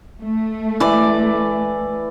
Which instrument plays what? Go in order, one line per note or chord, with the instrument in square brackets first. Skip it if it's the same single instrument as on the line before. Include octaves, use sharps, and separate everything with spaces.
[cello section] A3
[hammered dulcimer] E3 D5 D6